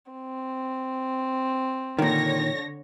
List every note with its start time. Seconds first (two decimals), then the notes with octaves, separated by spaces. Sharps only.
0.12 C4
1.99 A#2 D3 D#3 C#5 A#6